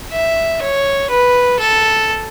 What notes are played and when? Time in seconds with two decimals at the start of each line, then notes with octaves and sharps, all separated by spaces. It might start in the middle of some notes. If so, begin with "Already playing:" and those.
0.12 E5
0.61 C#5
1.10 B4
1.59 A4